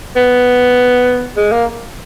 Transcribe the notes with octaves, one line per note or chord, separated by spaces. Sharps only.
B3
G#3
A#3